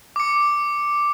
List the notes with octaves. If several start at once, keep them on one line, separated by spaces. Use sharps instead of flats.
D6 C#7